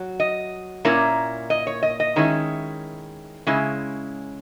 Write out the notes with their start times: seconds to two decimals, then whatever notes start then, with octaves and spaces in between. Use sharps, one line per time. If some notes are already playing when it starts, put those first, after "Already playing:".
Already playing: F#3
0.20 D#5
0.85 A#2 A#3 C#4 E4
1.50 D#5
1.67 C#5
1.83 D#5
2.00 D#5
2.16 D#3 G#3 C#4 E4
3.47 C#3 G#3 C#4 E4